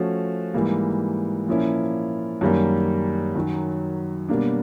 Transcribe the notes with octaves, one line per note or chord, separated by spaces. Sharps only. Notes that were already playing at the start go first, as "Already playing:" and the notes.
Already playing: F3 A3 C#4 F#4
G#2 E3 G3 A#3
A#2 F3 A#3 C#4 E4
F#2 D#3 G3 A#3
F#2 D#3 F#3
B2 G3 A#3 D4